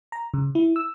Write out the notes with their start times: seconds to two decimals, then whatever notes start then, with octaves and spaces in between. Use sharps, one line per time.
0.12 A#5
0.34 C#3
0.55 E4
0.76 E6